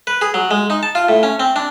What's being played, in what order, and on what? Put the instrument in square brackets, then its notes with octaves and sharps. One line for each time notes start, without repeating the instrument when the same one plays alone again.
[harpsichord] B4
G#4
F#3
G#3
D#4
A5
F4
A2
C#4
C4
D4